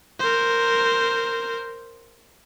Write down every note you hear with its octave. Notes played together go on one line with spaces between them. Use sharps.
A#4 C5